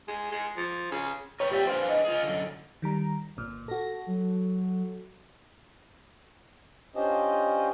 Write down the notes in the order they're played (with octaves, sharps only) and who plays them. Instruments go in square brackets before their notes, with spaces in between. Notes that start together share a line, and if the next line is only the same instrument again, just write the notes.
[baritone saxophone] G#3
G#3
F3
C#3
[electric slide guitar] A#4 B4 G5 [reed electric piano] C#5
[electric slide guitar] A#2 D5 E5 [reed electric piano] G4 G5
[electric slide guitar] D4 G#4 B4 [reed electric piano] C5 F5
[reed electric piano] D#5
[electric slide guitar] F4 G#4
F#2 D3
[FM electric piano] D#3 G3 A#5
G1 A#2
[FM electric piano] F#4 A4 [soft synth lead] A#6
[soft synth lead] F#3
[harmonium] C#4 D4 F4 G4 C5 D#5